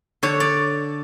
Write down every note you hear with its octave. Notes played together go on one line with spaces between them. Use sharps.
D3 C#5
D5